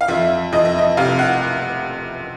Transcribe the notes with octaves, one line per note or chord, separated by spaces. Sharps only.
F5
F2 E5
F2 D#5
E5
D#5
C3 F5
F#5